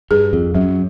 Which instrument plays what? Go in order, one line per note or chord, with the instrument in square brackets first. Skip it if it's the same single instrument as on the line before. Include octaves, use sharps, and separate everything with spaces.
[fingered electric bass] G2 [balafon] G#4
[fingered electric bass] F2
[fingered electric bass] F#2 [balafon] F#3